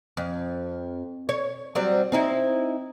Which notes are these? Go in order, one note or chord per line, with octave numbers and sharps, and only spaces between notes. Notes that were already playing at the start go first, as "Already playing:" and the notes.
F2
C#5
F#3 G3 C4
C4 D#4 E4